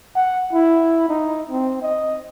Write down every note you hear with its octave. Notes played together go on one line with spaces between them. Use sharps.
F#5
E4
D#4
C4
D#5